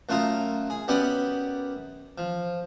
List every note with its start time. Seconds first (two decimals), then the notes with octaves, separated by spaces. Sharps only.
0.09 F#2 A3 F4 A#4 D#6
0.70 G#4
0.88 F#2 B3 G4 D5 B5 D#6
2.18 F3